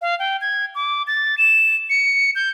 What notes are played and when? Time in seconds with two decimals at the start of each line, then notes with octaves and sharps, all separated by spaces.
0.02 F5
0.19 G5
0.41 G#6
0.75 D6
1.07 A6
1.38 E7
1.90 C#7
2.35 G6